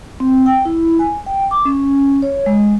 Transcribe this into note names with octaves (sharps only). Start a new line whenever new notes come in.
C4
G5
E4
G#5
G5
D6
C#4
C#5
G#3